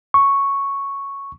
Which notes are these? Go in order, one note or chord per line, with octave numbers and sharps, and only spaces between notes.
C#6